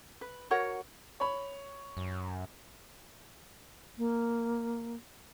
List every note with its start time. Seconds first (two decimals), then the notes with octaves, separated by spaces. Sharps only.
0.21 B4
0.51 F#4 A#4 C#5 F#5
1.20 C#5 B5
1.97 F#2
3.97 A#3